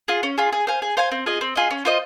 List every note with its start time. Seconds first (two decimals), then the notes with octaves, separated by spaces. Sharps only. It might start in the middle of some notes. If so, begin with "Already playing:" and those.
0.08 F4 G#4
0.23 C#4
0.38 F4 G#4
0.52 G#4
0.67 C5 F5 G#5
0.82 G#4
0.97 C5 F5 G#5
1.12 C4
1.26 F4 G#4 D#5
1.41 C4
1.56 F4 G#4 D#5
1.71 C#4
1.85 F4 C5 D#5